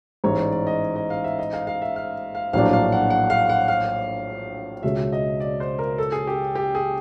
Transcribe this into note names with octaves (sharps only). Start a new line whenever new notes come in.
A1 G#2 E3 G#3 C#5
D5
D5
D#5
D#5
F5
E5
D#5
F5
F5
E5
F5
F5
A#1 A2 F#3 A#3 D4 F5
F5
F#5
F#5
F5
F#5
F5
C#2 B2 G#3 C#4 E5
D#5
D5
C5
A#4
A4
G#4
G4
G4
G#4